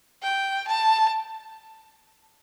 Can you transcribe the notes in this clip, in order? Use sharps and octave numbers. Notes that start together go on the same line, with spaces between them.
G5
A5